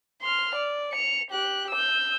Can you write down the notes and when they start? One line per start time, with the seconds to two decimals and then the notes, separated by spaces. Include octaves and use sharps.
0.22 C6 F6
0.55 D5
0.92 C#7 F7
1.31 G4 F#6
1.71 E6 G6